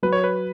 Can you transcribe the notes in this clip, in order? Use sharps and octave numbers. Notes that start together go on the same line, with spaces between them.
F#3 B4
C#5
B4